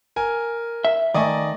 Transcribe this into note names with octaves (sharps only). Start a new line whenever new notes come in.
A#4 G#5
E5
D#3 A3 D5 D#5 G#5